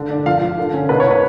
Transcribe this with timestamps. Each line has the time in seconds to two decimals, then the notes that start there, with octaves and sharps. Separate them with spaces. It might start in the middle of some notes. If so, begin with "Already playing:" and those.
Already playing: D3
0.10 D4
0.26 F3 F5
0.42 F3
0.58 D3
0.74 C#4
0.89 B2 B4
1.00 C#5
1.06 B2 B4